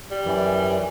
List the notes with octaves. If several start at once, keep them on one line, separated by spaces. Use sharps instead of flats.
G3
F#2 E3